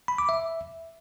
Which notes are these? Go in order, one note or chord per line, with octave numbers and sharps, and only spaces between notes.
B5
D6
E5